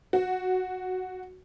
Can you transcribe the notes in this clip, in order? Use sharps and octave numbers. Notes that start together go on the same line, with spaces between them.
F#4